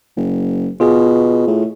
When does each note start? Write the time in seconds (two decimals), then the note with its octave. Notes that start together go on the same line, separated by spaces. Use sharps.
0.17 F#1
0.80 B2 F4 G#4
1.48 A2